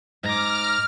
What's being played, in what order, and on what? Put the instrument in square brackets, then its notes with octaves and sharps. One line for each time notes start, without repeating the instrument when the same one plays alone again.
[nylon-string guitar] G#2 [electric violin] A#5 D6 [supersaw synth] F6